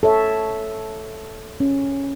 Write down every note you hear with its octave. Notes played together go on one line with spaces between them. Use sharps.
A4 C#5 E5
C#4